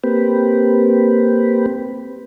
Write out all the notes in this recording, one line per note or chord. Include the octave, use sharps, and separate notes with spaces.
A#3 C4 G4 B4